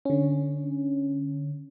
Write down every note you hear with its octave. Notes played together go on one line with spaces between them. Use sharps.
D3 C#4